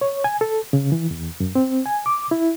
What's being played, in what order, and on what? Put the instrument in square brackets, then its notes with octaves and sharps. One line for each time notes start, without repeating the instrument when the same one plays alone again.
[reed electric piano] C#5
G#5
A4
C#3
E3
E2
F#2
C4
G#5
D6
E4